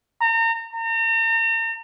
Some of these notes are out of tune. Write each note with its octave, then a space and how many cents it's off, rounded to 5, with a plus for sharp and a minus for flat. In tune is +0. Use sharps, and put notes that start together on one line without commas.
A#5 -35
A#5 -40